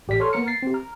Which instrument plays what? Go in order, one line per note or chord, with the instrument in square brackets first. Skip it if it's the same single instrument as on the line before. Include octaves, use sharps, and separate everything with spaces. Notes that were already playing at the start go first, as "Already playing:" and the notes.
[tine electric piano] A1 G4 D5 B6
A4 C#5 C6 C#6 F6
A#3 B3 A#5 F6 C#7
A6 C7
C4 G4
A#5 F6